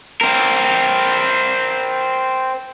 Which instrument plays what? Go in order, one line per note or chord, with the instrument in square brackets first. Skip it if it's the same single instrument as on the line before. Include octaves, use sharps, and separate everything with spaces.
[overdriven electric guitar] C4 A#4